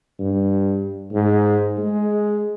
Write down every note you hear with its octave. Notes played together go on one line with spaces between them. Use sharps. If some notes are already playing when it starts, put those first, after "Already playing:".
G2
G#2
G#3